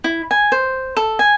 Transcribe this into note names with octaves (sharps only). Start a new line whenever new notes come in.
E4
G#5
C5
A4
G#5